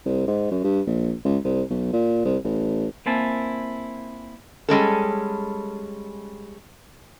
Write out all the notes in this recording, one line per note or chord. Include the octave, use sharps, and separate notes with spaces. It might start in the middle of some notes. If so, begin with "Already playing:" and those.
C2
G#2
F#2
G2
A#1
C#2
C2
B1
A#2
C2
A1
A#3 C4 E4 G#5 A5
G3 G#3 C#4 A4